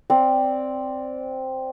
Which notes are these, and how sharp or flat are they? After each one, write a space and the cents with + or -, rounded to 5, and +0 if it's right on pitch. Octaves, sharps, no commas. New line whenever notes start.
C4 +0 D5 -5 F5 +40